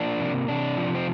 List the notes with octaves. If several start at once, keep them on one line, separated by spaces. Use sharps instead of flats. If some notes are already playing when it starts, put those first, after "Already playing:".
Already playing: F3 A#3 D4
C3
C3 D4
F3
C4